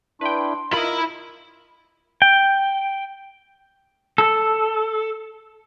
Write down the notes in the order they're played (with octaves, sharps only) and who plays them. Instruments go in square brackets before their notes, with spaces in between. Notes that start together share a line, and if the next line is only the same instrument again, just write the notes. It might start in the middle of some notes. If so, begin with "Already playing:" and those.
[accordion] D4 E4 [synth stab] B4 G5 [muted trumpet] C6
[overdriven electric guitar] E4 B5 [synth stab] F4 D#5 [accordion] A#4
[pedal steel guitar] G5
[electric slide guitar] A4